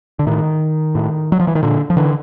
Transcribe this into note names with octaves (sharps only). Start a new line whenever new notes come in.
D3
A2 D#3
A2
F#3
F3
E3
D#3
A#2 D3
F3
D3 E3